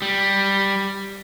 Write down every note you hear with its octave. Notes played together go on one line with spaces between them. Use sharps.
G3